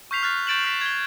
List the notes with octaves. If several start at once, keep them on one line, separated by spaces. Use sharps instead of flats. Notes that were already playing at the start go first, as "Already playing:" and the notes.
C#6 F6 G6 B6 C7 F7
F6 F#6 A6
C#6 G6 A6 D7 E7 F#7
F6 A6 B6 E7
G#6 G7